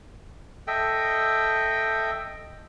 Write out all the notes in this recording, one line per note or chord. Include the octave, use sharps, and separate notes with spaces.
A4 D#5 E5 G5